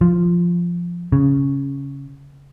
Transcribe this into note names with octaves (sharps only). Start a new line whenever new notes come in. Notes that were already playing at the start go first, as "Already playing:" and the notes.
F3
C#3